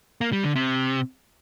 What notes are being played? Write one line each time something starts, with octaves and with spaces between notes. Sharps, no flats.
A#3
G3
D3
C3